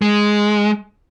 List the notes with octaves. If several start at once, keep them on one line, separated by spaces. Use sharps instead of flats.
G#3